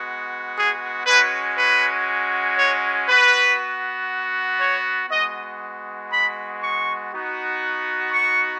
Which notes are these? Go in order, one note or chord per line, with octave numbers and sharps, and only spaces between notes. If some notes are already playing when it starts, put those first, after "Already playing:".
Already playing: G#3 B3 F#4
G#4
G#3 C#4 F#4 B4
B4
C#5
B3 F#4 B4
C#5
G#3 B3 F#4 D#5
B5
C#6
B3 D#4 F#4
C#6